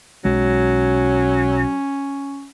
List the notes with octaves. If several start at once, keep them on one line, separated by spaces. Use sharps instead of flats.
B1 F#3 G#3 C#4